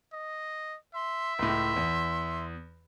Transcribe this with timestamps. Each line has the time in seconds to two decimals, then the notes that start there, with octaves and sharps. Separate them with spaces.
0.13 D#5
0.95 E5 C6
1.39 C#2 A2 C6
1.76 E2